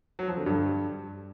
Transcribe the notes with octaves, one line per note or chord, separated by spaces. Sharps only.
F#3
F3
D3
G2